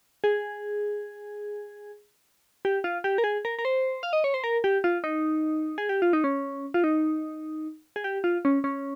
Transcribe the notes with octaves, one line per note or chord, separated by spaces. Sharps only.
G#4
G4
F4
G4
A#4
G#4
A#4
A#4
C5
F5
D#5
C#5
C5
A#4
G4
F4
D#4
G#4
G4
F4
D#4
C#4
F4
D#4
G#4
G4
F4
C#4
C#4